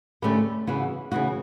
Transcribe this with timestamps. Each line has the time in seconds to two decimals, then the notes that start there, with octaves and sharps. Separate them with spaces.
0.22 D3 A3 C#4 G4 B4
0.67 C#3 E3 B3 F#4
1.12 C#3 E3 B3 F#4